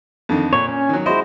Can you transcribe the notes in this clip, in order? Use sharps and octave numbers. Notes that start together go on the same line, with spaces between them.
F2 D3 D#3
A#2 C#5
C#4
D#3 F#3
G#3 E4 F#4 C5 D#5